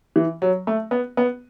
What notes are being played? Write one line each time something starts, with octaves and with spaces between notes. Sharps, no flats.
E3
F#3
A3
B3
B3